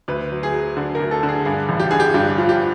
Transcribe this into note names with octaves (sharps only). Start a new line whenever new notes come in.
D2 B4
F#3
G#4
F#3
D3
A#4
D2
A4
D3
G#4
G2 G#4
A1
G4
D3 G#4
G4
G2 G4
F3
G4